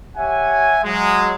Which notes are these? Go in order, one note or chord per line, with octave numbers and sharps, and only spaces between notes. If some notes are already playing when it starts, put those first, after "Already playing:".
G4 C#5 E5 F#5 G#5
F#3 G#3